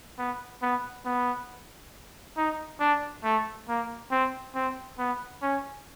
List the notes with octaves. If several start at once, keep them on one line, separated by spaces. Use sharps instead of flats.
B3
B3
B3
D#4
D4
A3
A#3
C4
C4
B3
C#4